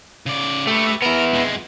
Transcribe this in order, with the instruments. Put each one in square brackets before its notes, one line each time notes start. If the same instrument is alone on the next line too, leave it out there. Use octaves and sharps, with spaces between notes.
[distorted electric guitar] C#3 D5
[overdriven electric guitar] A3 [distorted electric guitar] G4 B4
[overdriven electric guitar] B3 E4 [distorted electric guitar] A#4
[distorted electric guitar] F2 G#3